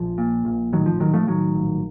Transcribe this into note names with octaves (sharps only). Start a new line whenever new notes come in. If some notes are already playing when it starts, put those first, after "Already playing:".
Already playing: A#1 F3
A#2
A#1
A2 D#3 F#3
F3
A2 D#3 F#3
F3 A3
A2 D#3 F#3
A#1